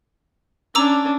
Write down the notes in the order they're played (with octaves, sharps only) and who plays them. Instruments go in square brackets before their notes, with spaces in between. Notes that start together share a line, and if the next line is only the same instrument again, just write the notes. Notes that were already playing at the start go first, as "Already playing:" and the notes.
[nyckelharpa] C#4 D4 [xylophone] A#5 D6 E6